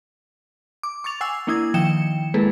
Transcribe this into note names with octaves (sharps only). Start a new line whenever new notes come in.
D6
C#6 D6 A6 F7
F#5 G#5 E6 C7
A#3 D4 E4 D#6 G#6
D#3 F3 G5 D#6 C#7 E7
G#3 A#3 E4 G#4 A4 B4